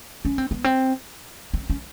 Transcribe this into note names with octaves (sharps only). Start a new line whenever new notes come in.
C#4
C4
B3
C4
C4
C#4